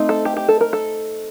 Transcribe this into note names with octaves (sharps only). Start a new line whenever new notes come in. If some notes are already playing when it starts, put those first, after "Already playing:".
Already playing: A3 C4 D#4
A4
G4
G4
A4
A#4
A4